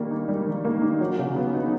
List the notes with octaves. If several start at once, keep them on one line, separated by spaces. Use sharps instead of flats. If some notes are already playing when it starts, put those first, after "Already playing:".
Already playing: D#3 G3 A#3
D#4
G3
D#3
A#3
D#4
F#3
C#3
B3
D#4